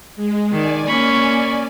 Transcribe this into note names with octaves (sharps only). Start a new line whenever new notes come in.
G#3
D#3 D5 G#5
A#3 C#4 B5 C#6